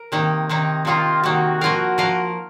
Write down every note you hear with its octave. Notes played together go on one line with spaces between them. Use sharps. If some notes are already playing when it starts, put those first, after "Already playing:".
Already playing: A#4
C3 D#3 A#3 D#4
C3 D#3 A#3 D#4
C3 D#3 A#3 D#4 F4
C3 D#3 A#3 D#4 F#4
F3 A#3 F4 A#4 F5
F3 A#3 F4 A#4 F5